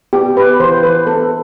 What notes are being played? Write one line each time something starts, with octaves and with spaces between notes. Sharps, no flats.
B3 G4
B3 B4
E3 C5
E3 B4
B3 A4